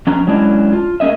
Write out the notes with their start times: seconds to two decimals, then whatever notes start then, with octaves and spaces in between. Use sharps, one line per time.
0.07 F3 C#4 D4 A#5
0.27 F#3 G#3 C#4 D4 E4
0.73 F4
1.00 G#3 A#3 C#4 D#5 E5